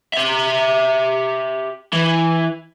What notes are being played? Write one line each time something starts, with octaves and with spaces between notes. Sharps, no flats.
G4 E5
E3